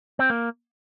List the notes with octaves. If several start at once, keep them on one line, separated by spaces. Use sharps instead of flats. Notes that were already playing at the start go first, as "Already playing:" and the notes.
C4
A#3